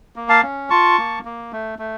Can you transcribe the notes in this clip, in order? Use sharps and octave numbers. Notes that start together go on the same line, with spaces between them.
A#3
F5 A5
C#4
F4 A5 C#6
A#3
A#3
A3
A3